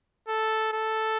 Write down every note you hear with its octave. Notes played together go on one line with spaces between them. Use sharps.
A4
A4